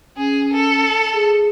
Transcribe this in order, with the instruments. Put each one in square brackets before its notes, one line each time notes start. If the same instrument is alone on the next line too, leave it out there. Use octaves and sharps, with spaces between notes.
[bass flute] C#4 [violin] G#4
[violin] A4
[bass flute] G#4